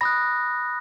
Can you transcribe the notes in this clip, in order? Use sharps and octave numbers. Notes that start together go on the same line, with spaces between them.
B5 D#6 F#6 A#6